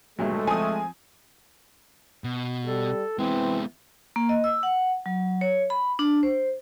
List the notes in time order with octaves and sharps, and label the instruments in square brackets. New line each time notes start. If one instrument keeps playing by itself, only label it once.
[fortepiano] G2 A#2 F#3 [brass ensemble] G#3 A3
[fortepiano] F3 C4 [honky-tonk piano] G#5 D#6
[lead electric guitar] B2
[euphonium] G3 [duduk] A4
[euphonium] E3 [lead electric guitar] G#3 B3 [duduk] C4
[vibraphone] A#3
D#5
E6
F#5
F#3
C#5
B5
D4
C5